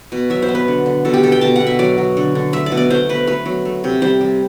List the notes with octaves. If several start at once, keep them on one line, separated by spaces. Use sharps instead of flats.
B2
F#3 E5
C5
B3
B4
D3
D3
B2 A4
G4
B2 A4
G5
B2 A5
B2 F#5
E5
F#3 D5
F#3
D3
D3
A3 E5
D5
B2
D5
A3 C5
B2 B4
A3 B4
F#3
A3
C3
G3 C5
G3